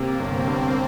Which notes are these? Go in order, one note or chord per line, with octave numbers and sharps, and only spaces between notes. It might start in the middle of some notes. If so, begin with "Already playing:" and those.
Already playing: C3 A#3
G1 C4
G2